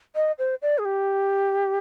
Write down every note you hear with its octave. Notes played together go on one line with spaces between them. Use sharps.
D#5
C5
D5
G#4
G4